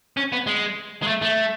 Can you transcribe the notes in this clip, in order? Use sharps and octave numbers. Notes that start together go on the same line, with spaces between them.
C#4
B3
G#3
G#3
A3
A3